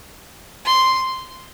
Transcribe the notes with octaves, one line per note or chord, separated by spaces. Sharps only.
C6